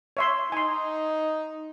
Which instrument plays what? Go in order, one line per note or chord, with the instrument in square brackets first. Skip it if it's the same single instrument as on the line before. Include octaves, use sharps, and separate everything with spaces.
[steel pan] C#5 E5 C6
[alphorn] D#4 [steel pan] G#5 C6